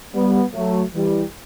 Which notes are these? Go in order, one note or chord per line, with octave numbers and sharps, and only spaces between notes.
G3 B3
F#3 A3
E3 G3